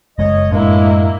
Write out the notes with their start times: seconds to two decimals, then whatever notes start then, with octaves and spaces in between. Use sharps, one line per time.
0.19 F#1 G#3 C#5 D#5
0.51 F#2 A2 G#3 A#3 D4 E4